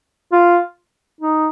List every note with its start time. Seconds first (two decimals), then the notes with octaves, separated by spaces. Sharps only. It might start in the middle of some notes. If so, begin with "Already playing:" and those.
0.32 F4
1.21 D#4